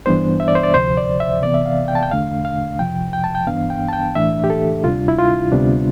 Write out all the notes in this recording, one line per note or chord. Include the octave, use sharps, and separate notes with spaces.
G2 E3 G3 B3 D4 C5
E5
D5
C5
D5
D2 C3 F3 C5
D5
E5
C3 E3 B3 D5
E5
F5
G5
A5
G5
E2 D3 A3 D4 F5
F5
F2 C3 F3 G5
G5
A5
G5
G2 E3 B3 D4 F5
G5
A5
G5
A2 E3 A3 D4 E5
G4
A4
D2 C3 G3 D4 F4
E4
F4
D2 C3 G3 B3 D4